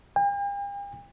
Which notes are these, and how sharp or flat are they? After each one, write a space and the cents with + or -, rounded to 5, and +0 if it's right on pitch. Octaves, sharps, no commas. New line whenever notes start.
G5 +45